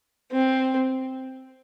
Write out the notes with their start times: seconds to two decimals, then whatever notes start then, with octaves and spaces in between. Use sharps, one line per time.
0.31 C4